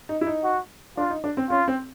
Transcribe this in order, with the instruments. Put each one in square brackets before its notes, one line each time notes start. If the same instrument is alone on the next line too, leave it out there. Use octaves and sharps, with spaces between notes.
[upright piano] D#4
E4
D#4
[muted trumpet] F#4
[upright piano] D4 [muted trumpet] F4
[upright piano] D#4
D4
C4
[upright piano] C#4 [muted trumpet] F4
[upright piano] C4